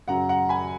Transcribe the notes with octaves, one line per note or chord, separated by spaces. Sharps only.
F#2 C#3 F#3 F#5 A#5
F#5 A#5
G#5 B5